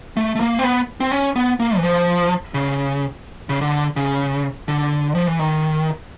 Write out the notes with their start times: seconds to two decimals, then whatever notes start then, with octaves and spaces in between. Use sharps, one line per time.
0.17 A3
0.35 A3
0.40 A#3
0.59 C4
0.64 B3
1.00 C4
1.12 C#4
1.36 B3
1.60 A#3
1.77 E3
1.83 F3
2.54 C#3
3.49 C#3
3.61 D3
3.96 C#3
4.68 D3
5.15 F3
5.27 E3
5.39 D#3